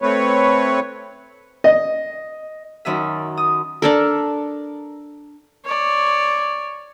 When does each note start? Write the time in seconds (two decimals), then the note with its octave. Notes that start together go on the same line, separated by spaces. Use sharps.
0.02 A3 C4 B4 C#5
1.64 D#5
2.85 F#2 D#3 D#5 E5
3.37 D#6
3.82 D4 A4 A#4
5.65 C#5 D5